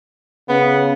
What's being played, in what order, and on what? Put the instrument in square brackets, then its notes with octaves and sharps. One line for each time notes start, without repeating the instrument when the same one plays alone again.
[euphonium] C#3 [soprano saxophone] B3